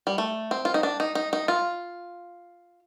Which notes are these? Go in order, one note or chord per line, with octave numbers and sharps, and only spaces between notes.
G3
A3
C4
F4
D#4
D4
D#4
D#4
D#4
F4